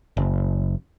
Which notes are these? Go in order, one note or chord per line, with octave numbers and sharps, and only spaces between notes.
F#1